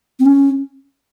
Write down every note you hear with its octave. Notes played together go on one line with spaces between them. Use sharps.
C4
C#4